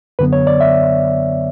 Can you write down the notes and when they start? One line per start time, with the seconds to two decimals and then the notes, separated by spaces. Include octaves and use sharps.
0.19 F#2 D3 F#3 B3 B4
0.33 C#5
0.47 D5
0.61 E5